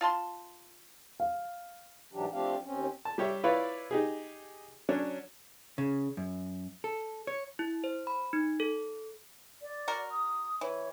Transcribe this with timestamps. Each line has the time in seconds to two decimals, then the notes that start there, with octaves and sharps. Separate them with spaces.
0.01 F4 A5 C6
1.20 F5
2.13 G#2 E3 F#3 D4 G4
2.33 F3 A3 C4 D4 G4 F5
2.64 D#2 C4 C#4
3.05 A5
3.18 G3 G4 C#5 E5
3.44 E4 F4 B4 C#5 D5 F5
3.91 D#4 G4 G#4
4.89 F#3 C#4 D4
5.78 C#3
6.17 F#2
6.84 A4
7.27 C#5
7.59 E4
7.84 C5
8.07 B5
8.33 D#4
8.60 A4
9.61 D5
9.88 F#4 A#4
10.11 D#6
10.61 E3 C#5